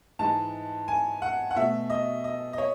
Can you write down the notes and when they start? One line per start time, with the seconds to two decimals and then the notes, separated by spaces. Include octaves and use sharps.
0.19 G#2 E3 G#3 A5
0.88 G#5
1.22 F#5
1.51 F#5
1.56 B2 A3 E5
1.90 D#5
2.24 D#5
2.53 D#5
2.58 C#5